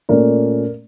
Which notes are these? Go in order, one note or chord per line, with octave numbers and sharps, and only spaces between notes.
A#2 A3 C#4 A#4 D5